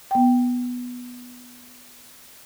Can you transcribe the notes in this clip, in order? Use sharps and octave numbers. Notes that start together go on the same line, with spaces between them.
B3 G5